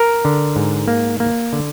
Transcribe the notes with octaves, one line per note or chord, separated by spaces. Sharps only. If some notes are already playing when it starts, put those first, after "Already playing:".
Already playing: A#4
D3
G#2
A#3
A#3
D3